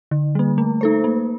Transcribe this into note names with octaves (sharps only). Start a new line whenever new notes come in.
D3
G3 A#3
A3
D#4 A4 C5
A#3